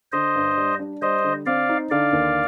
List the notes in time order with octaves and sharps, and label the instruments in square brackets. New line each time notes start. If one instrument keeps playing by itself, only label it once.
[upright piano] D3 [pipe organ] C5 D#5
[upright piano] G2
G3
D4
[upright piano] G3 [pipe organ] C5 D#5
[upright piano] D3
[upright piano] C4 [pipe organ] D5 F5
[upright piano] D#4
[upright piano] D3 [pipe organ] D5 F5
[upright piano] D#2